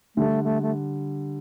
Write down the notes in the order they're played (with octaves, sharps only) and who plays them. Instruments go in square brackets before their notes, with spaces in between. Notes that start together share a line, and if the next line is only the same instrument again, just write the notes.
[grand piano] D3 G3 [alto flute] A3
[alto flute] A3
A3